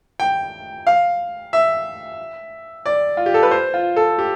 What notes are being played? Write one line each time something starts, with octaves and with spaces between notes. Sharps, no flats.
G5
F5
E5
D5
F4
G4
A4
B4
C5
F4
A4
G4